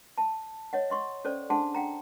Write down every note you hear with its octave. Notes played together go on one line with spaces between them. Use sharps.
A5
C#5 D#5 F#5
D#5 C6 C#6
C#4 A4 C5 D5
D4 G#4 F#5 A5 C6
F#5 G5 A#5